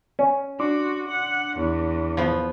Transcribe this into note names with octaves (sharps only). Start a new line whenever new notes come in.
C#4
D4 F#4 C6 D6
F#5
E2
F3 B3